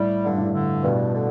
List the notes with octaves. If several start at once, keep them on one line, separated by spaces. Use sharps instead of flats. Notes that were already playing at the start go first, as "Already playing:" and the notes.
Already playing: A2 G3
G2 D3
A2
D3
G2 B2
D3